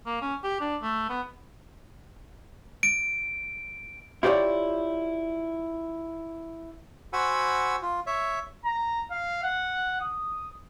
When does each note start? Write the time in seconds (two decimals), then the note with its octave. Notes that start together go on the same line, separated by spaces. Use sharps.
0.06 A#3
0.21 C#4
0.44 G4
0.60 D4
0.82 A3
1.10 B3
2.83 D7
4.23 E4 F4 G4 B4 C#5 D5
7.13 F#4 C5 F#5 G#5 B5 E6
7.82 F4
8.07 C#5 E5
8.65 A#5
9.11 F5
9.44 F#5
10.01 D#6